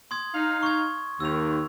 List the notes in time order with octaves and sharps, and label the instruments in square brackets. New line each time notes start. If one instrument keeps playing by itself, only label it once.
[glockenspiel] C6 D#6 G#6
[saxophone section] D#4 F5
[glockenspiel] C#6 G#6
[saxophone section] D#2 [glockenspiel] E6 F7